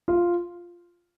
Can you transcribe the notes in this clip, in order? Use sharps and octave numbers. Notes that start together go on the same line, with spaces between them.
F4